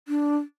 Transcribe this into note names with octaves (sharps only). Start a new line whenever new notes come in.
D4